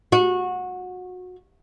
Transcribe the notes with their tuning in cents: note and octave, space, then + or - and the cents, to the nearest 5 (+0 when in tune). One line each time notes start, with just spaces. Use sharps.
F#4 -25